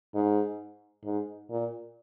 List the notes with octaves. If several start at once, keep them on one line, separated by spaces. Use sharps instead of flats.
G#2
G#2
A#2